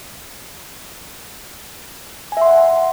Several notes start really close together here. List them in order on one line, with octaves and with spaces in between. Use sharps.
G#5 E5 C6 F#5